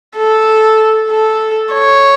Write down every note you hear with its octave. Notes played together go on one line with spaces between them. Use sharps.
A4
A4
C#5